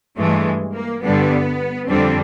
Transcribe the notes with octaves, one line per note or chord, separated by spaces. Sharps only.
G2 E3 G#3 A3
A#3
G2 D3 G3 B3
F2 D3 G3 C4